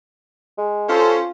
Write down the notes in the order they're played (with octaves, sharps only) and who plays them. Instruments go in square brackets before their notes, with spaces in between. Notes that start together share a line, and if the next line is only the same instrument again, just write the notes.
[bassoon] G#3
[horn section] C#4 C5 [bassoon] F4 [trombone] A4